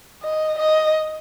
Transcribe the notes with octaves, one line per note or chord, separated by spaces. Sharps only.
D#5
D#5